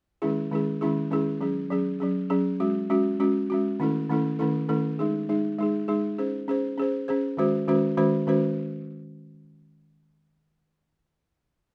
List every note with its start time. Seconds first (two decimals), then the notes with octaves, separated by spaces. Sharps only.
0.22 D#3 G#3 C#4 E4 G#4
0.51 D#3 G#3 C#4 E4 G#4
0.81 D#3 G#3 C#4 E4 G#4
1.11 D#3 G#3 C#4 E4 G#4
1.41 F#3 C#4 G#4
1.70 F#3 C#4 G#4
2.00 F#3 C#4 G#4
2.30 F#3 C#4 G#4
2.60 G#3 C#4 F#4
2.90 G#3 C#4 F#4
3.20 G#3 C#4 F#4
3.50 G#3 C#4 F#4
3.80 D#3 A3 C#4 E4 A4
4.10 D#3 A3 C#4 E4 A4
4.39 D#3 A3 C#4 E4 A4
4.69 D#3 A3 C#4 E4 A4
4.99 G#3 D#4 G#4
5.29 G#3 D#4 G#4
5.59 G#3 D#4 G#4
5.88 G#3 D#4 G#4
6.18 C#4 G#4 C5
6.48 C#4 G#4 C5
6.78 C#4 G#4 C5
7.08 C#4 G#4 C5
7.37 D#3 G#3 C#4 F#4 C5
7.68 D#3 G#3 C#4 F#4 C5
7.97 D#3 G#3 C#4 F#4 C5
8.27 D#3 G#3 C#4 F#4 C5